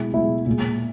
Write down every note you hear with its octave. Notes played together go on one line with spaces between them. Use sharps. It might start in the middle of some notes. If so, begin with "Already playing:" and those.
Already playing: B2 G#3 E4
B2 G#3 E4
A#2 G#3